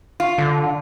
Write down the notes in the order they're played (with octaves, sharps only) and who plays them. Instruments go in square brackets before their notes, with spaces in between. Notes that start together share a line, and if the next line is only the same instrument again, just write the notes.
[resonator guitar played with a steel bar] F4
[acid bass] D3